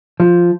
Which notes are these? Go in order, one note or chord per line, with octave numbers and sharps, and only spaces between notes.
F3